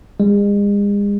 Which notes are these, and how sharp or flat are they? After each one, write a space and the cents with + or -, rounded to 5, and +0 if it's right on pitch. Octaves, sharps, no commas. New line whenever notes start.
G#3 -40